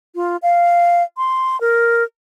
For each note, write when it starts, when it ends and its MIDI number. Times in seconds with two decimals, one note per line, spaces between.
0.15 0.37 65
0.43 1.03 77
1.17 1.59 84
1.61 2.04 70